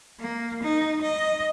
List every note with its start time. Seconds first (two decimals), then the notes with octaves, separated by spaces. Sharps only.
0.20 A#3
0.63 D#4
1.02 D#5